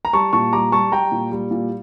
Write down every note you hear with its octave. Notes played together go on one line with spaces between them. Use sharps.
A#5
G3 A5 C#6
A#2 A5 C#6
G3 A#5 D6
G3 A5 C#6
G3 G5 A#5
A#2
G3
A#2